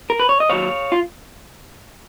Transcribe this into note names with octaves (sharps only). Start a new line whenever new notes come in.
A#4
B4
C#5
D#5
D#2 D#3 F#3 C#5 F5
F4